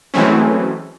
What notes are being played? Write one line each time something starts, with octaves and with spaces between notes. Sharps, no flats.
E3 F#3 G#3 A3 C4 C#4